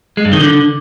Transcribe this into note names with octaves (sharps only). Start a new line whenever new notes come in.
G#3
G2
D#3
D3